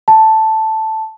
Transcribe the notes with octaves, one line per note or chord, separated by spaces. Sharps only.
A5